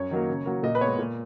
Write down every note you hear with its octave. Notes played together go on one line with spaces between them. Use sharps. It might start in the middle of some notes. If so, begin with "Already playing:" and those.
Already playing: F#2 C#5
D#3 F#3 A#3
C#3
F#3 A#3
A#2 D#5
B4
G#3 B3 C#5
A#2